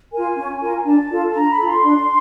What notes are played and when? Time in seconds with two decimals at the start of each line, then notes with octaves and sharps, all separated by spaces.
0.13 F4 A#4 G#5
0.37 C#4
0.62 F4 A#4
0.85 D4 A5
1.10 F4 A4
1.34 D4 A#5
1.45 C6
1.50 B5
1.58 F4 A4
1.66 C6
1.82 D4